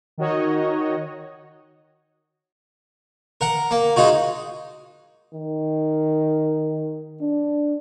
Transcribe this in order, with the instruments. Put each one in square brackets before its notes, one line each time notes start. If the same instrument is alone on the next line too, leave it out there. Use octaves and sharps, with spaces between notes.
[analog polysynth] D#3 D#4 F#4 C#5 D#5
[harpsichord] A#4 F#5
A#3
G#3 D#4 F4 F#4
[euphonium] D#3
D4